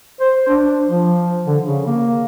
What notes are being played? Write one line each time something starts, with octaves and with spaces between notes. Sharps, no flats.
C5
D4
F3
D3
C#3
A#3